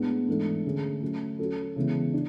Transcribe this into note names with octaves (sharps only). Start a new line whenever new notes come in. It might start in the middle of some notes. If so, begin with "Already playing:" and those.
Already playing: A2 G#3 B3 D4
G#2 E3 A3 D4 A4
D3 A3 C#4 G#4
F#3 A3 C#4
F#3 C#4 F#4 A4
C#3 E3 G#3 B3
D4